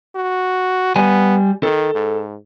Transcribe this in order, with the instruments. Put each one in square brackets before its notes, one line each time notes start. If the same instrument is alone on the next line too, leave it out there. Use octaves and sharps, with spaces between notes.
[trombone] F#4
[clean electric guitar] G3 G#5 [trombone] B3
[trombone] D#3 [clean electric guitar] A4
[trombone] G#2